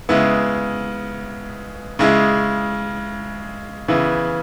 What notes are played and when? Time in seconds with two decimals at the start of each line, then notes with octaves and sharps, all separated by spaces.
0.09 C#3 G#3 B3 E4
1.99 C#3 G#3 E4
3.88 C#3 E3 B3 E4